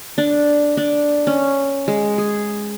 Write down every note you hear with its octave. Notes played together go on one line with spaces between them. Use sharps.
D4
D4
C#4
G#3
G#4